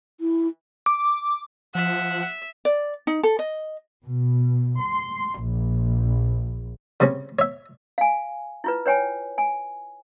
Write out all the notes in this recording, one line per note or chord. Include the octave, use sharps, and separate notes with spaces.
E4
D6
F3 E5 F#5
D5
D#4
A4
D#5
B2
C6
A#1
C#3 G3 C4 C#4
C#5 E5
F5 G#5
E4 F4 B4
B4 C#5 G5 G#5
G#5